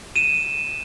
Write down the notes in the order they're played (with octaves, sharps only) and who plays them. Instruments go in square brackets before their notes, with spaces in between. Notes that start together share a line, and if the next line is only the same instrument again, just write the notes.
[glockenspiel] D#7 E7